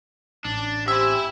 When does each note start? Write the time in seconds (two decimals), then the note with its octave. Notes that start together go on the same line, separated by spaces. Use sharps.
0.45 A1 D4
0.88 C4 G4 E5 G#5 B5 E6